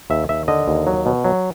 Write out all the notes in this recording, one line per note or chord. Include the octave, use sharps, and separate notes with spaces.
D#2 E5
D#2 E5
D3 D#5
D#2
F#3
B2
F#3